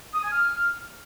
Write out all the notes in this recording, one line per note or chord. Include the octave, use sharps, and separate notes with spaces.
D#6
G#5
F6